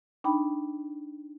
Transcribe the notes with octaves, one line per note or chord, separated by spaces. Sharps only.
D4 D#4 G5 B5